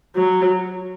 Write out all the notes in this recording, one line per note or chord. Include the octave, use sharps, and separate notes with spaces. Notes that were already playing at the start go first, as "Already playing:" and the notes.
F#3